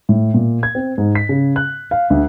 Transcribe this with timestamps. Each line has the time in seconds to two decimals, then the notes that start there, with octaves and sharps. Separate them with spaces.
0.09 A2
0.34 A#2
0.63 G#6
0.75 C4
0.98 G#2
1.15 B6
1.29 C#3
1.56 F#6
1.91 F5
2.10 D2